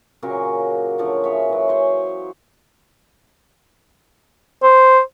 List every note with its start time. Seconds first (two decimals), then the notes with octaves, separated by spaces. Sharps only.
0.22 A#2 C#3 F#3 A#3
0.98 D3 F3 F#3
1.24 G#4 C#5 E5
1.49 E3 F#3
1.68 C5 C#5 G#5 C6
4.63 C5